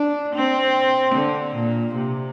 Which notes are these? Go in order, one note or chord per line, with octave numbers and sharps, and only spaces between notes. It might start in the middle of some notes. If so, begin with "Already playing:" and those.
Already playing: D4
C4
D3
A#2
C3